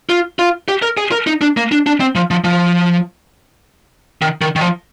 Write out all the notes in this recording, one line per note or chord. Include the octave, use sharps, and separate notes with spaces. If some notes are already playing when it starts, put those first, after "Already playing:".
F4
F4
G4
A#4
G#4
A#4
D#4
D4
A#3
D4
D4
C4
F3
F3
F3
D#3
D#3
D#3
F3